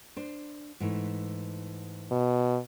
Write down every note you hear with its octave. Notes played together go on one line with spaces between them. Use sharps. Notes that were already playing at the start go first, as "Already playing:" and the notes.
D4 C5
G#2 E3 A3
B2